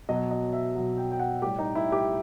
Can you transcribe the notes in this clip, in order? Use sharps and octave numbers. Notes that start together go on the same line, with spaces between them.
B2 F#3 D#5
D#5
E5
B2 F#3
G5
G5
F#5
A2 G3 G4
D#4
E4
G4